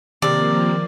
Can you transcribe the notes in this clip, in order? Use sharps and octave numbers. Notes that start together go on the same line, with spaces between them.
C3 D#3 F3 A#3 C4 A#4 D5